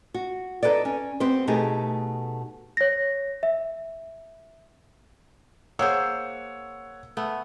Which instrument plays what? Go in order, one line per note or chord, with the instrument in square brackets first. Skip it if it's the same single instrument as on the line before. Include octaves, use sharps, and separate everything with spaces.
[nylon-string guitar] F#4
D#4 E4 A4 B4 D5
C#4
B3 C4 G4 C5
B2 A3 D#4 G4 G#4
[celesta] C#5 A#6
E5
[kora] A#3 G#4 C5 [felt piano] C#5 F#5 E6
[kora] A3 B3